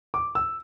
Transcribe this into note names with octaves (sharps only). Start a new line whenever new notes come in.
D6
E6